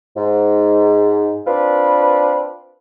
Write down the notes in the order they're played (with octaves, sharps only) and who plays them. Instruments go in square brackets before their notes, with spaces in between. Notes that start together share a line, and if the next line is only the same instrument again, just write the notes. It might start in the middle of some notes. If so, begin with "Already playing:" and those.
[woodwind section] G#2
C4 D4 F4 B4